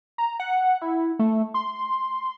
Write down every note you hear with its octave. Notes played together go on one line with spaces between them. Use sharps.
A#5
F#5
E4
A3
C6